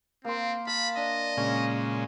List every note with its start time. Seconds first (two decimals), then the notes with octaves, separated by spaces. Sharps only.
0.25 A#3 C4 C6
0.67 F5 A5 B5
0.97 D4 D#5
1.37 A#2 C#3 G#3 C#4